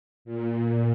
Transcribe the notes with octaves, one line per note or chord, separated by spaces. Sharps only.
A#2